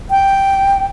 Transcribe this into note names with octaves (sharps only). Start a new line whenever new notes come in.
G5